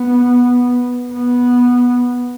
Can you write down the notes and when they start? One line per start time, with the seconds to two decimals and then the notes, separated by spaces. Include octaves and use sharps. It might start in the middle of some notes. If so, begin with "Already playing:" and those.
Already playing: B3
1.13 B3